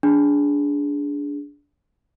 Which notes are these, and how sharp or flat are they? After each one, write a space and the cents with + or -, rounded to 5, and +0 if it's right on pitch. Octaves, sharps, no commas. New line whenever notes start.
D4 -20 G#4 +0